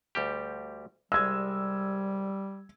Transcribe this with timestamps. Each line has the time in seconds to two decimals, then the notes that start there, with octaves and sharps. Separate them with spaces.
0.15 D2 G3 G4
1.12 C2 G3 G#3 E6 G#6